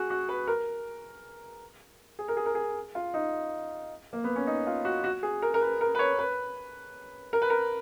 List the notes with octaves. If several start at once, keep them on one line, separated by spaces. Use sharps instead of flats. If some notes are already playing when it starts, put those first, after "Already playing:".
Already playing: F#4 G#4
F#4
B4
A#4
G#4
A#4
G#4
A#4
G#4
F4
D#4
A#3
B3
C#4
D#4
F4
F#4
F#4
G#4
A#4
A#4
B4
A#4
B4
C#5
B4
A#4
B4
A#4